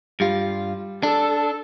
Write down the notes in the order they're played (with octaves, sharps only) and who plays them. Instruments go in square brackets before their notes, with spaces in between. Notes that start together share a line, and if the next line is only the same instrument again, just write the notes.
[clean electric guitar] G2 F4 [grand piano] G3
[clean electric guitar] D4 [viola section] A4